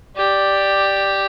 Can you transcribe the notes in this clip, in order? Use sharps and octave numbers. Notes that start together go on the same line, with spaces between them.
G4 D5